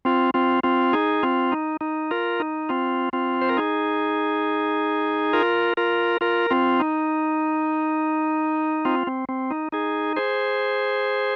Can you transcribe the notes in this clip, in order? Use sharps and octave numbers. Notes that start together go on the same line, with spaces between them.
C4 F4
C4 F4
C4 F4
D#4 G#4
C4 F4
D#4
D#4
F4 A#4
D#4
C4 F4
C4 F4
C5
A#4
D#4 G#4
F4 A#4
F4 A#4
F4 A#4
C4 F4
D#4
C4 F4
C4
C4
D#4
D#4 G#4
G#4 C5